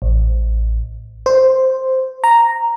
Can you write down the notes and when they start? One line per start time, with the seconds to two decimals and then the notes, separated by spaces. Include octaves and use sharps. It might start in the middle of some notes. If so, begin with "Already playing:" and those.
0.02 A1
1.26 C5
2.24 A#5